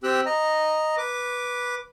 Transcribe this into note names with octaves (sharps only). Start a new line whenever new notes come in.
C4 G4 G5 E6 F#6
D#5 A#5
B4 D6